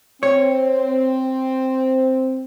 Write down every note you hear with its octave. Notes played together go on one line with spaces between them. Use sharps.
C4 C#5